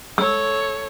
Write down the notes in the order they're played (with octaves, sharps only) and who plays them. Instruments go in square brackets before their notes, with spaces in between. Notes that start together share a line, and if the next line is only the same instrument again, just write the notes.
[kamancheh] A4 C#5 [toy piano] E6